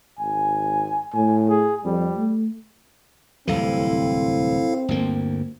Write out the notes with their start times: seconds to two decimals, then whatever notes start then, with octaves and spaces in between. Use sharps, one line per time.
0.19 G#1 G#5
1.14 A2 G#5
1.49 G#4
1.85 F2 G3
2.16 A3
3.48 D1 C2 E3 C4 E4 A4 F5
4.88 G1 D2 A#3